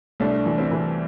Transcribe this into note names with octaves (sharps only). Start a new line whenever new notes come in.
C2 A3 D4
E3
C4 E4
E3